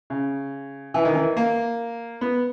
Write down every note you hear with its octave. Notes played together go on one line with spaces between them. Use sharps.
C#3
E3
D#3
E3
A#3
B3